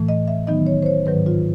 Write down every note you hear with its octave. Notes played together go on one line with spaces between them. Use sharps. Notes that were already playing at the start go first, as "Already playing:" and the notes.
Already playing: A2 E3 A3
D#5
E5
D#3 F#3 B3 D#4 D#5
C#5
C5
C#5
G#2 D#3 F#3 B4
F4